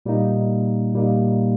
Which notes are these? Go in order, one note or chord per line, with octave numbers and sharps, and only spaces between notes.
A#2 G3 A#3 D#4
A#2 G3 A#3 D#4